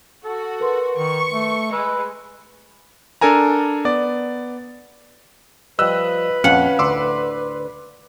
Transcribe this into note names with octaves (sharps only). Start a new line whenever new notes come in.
F#4 A4
A#4 B4 C6
D#3 C#6
A3
G#3 B4 E6
D4 A4 A#4 G#5 A#5
B3 D5
F3 G3 B4 D#5 E6 F#6
A#1 F2 C#4 F5 F#5
D2 A2 C6 D6 E6